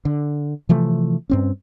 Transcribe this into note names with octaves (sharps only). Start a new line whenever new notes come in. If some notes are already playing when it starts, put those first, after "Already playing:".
D3
C3 E3 F3 A3
G2 C4 C#4